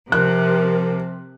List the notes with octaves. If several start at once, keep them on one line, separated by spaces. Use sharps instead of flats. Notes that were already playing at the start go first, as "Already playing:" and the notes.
C3 F3 A#4 F#6